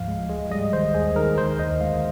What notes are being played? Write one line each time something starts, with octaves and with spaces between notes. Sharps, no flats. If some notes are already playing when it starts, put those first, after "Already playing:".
Already playing: D2 G#2 F3 F5
G#3
G#3
G3 D#5
D#3 C5
D#2 G#4
D#3 A#4
D3 C5
D#2 D#5
G#3 F5